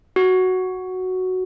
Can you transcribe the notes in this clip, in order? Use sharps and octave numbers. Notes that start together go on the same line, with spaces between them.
F#4